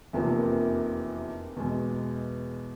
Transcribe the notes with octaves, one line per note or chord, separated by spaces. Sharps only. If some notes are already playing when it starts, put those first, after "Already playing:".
F1 E2 C3 F3 A#3
E2 B2 G#3